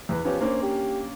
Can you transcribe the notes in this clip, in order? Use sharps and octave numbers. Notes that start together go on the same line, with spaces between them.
E2 B4
F3 B3 C#4 G4
A#3 C#4 D4 C5
G4